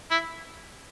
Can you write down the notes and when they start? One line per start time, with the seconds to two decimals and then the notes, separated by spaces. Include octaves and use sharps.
0.11 E4